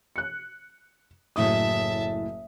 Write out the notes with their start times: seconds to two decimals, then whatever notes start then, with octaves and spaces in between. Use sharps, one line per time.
0.16 F#6 C#7
1.36 F#1 A2 E5 A5 D#6